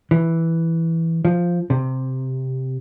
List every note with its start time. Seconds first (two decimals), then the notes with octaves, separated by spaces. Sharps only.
0.11 E3
1.25 F3
1.70 C3